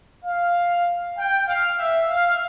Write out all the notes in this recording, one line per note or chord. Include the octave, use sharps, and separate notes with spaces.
F5
G5
F5
E5
F5